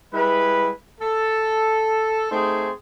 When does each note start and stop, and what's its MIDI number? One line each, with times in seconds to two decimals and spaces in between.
0.13 0.69 55
0.13 0.69 56
0.13 0.69 64
0.13 0.69 71
1.01 2.28 69
2.31 2.70 57
2.31 2.70 60
2.31 2.70 63
2.31 2.70 68
2.31 2.70 80
2.31 2.70 84